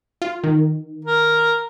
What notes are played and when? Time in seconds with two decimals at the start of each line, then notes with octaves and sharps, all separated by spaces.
0.22 F4
0.44 D#3
1.05 A#4